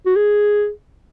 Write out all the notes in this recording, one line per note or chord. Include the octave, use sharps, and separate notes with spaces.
F#4
G#4